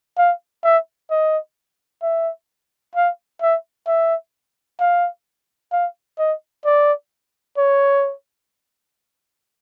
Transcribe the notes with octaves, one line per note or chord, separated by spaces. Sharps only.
F5
E5
D#5
E5
F5
E5
E5
F5
F5
D#5
D5
C#5